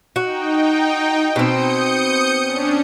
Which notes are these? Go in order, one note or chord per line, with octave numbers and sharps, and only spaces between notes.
D#4 F#4 G5
B2 C4 D#6 G6 C#7
C#4 D4